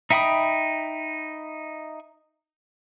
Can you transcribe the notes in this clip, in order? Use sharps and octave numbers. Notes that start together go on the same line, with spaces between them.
D#4 E5 G5 B5 D#6